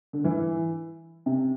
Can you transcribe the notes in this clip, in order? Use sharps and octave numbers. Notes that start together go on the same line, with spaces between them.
D3
E3
C3